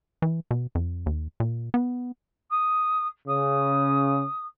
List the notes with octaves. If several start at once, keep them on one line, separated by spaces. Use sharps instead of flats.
E3
B2
F2
D#2
A#2
B3
D#6
C#3 D#6